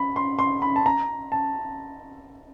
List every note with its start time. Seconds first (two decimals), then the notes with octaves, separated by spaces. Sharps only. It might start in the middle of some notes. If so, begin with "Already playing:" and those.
Already playing: B5
0.16 C6
0.39 C6
0.62 B5
0.76 A5
0.86 A#5
1.32 A5